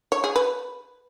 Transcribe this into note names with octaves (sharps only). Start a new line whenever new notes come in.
C#5
G#4
B4